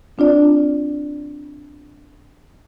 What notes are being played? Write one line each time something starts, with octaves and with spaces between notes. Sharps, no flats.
C4 D4 F4 D5